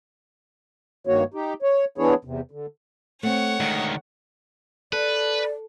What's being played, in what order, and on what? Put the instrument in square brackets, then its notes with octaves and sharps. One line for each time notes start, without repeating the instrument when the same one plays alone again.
[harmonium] G2 D#3 A#3 F#4 C#5
D#4 G4
C#5
E3 B3 D4 E4 G#4 C#5
E2 C3
D3
[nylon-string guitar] A3 C4 [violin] C#5 F#5
[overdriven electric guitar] D2 D#3 [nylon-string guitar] G#3
[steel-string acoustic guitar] A4 [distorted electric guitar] B4 [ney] D5